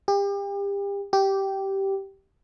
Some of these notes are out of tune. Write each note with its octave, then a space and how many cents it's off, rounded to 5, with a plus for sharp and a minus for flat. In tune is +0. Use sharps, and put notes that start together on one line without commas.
G4 +35
G4 -10